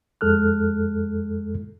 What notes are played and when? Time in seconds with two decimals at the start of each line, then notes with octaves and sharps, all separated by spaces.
0.21 F2 G#3 A4 F6 F#6